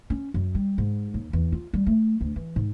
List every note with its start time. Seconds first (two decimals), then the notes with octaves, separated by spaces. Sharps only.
0.10 C#4
0.34 F#2
0.55 G3
0.78 G#2
1.14 D#2
1.33 E2
1.52 F4
1.73 G3
1.87 A3
2.21 D2
2.36 E3
2.56 G#2